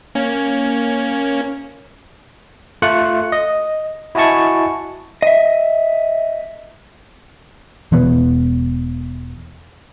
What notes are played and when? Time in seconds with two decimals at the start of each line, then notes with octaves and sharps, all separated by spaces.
0.15 A#3 C#4
2.82 A3 F4 F#6 C#7
3.32 D#5
4.15 E4 F#4 D#5 G#5 A5 C#6
5.22 D#5 E5
7.92 E1 E2 B3